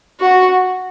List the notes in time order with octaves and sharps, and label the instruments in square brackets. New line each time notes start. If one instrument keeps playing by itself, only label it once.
[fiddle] F#4